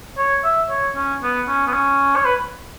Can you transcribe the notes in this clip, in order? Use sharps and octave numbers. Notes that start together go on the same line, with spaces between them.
C#5
E5
C#5
C#4
B3
C#4
B3
C#4
C#5
B4